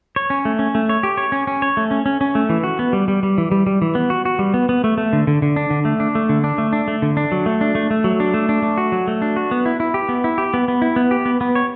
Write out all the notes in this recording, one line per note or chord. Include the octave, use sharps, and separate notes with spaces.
C#5
C#4
A3
C#4
A3
C#5
G4
C#5
C#4
C#4
C#5
A3
C#4
C#4
C#4
A3
E3
F#4
B3
G3
G3
G3
E3
G3
G3
E3
B3
F#4
F#4
G3
B3
B3
A3
A3
D3
D3
D3
D4
D3
A3
D4
A3
D3
D4
A3
D4
A3
D3
D4
F#3
A3
D4
A3
A3
F#3
D4
A3
D4
A3
F#4
F#3
A3
D4
F#4
B3
E4
E4
G4
B3
E4
G4
B3
B3
E4
B3
G4
B3
B3
C#5